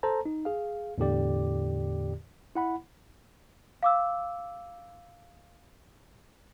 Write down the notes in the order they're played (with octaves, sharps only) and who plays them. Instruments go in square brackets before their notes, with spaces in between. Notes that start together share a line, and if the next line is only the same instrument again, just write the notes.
[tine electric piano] A4 C5 A5 A#5
D#4
G#4 F5
E2 A2 D3 G4 D5
E4 F#5 B5
[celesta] F5 D6 E6